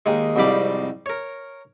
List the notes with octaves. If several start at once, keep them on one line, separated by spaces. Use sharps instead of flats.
D#2 D#3 G#3
C2 F2 G#2 G3 B5 D6
A#4 C#5